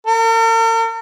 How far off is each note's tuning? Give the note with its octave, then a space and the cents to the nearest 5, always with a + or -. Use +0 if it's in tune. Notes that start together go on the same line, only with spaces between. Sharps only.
A#4 -45